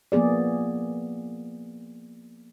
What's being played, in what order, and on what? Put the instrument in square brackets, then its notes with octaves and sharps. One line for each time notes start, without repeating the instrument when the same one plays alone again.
[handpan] F3 A#3 B3 G#4 D5